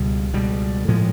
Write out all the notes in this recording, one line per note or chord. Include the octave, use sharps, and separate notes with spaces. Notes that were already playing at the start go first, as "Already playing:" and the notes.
Already playing: C#2 B2 G3
C#2 B2 G3
A2 F3 G#3